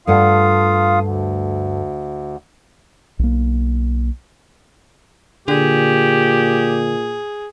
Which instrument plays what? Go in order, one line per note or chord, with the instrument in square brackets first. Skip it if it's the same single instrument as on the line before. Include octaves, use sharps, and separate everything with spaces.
[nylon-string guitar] G2 A3 F#5 [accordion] F4 F5 D#6
[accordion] D2
[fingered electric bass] B1 A#3
[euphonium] A#2 [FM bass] D3 [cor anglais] G4 [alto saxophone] G#4